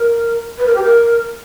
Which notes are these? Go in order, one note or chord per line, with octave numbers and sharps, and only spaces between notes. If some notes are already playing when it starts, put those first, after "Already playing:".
Already playing: A#4
B4
A#4
G4
A#4